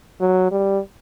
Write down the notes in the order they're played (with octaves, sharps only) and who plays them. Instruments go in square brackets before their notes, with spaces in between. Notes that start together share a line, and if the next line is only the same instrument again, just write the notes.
[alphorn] F#3
G3